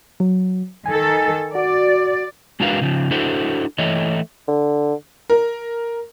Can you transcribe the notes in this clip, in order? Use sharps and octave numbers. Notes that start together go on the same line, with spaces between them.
F#3
D#3 A4 G#5
F#4 D5
G#3 D4 F#4 A#4 B4 F5
C#3 F3
D4 E4 F#4 A4 C5
E3 A3 C#5 D#5
D3
A#4